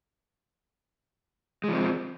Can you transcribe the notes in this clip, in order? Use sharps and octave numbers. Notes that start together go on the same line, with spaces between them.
F3 G#3 C4